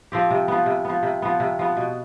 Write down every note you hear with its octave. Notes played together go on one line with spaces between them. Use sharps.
F3 C4 G4
C3
F3 B3
C3
F3 B3
C3
F3 B3
C3
F3 B3
B2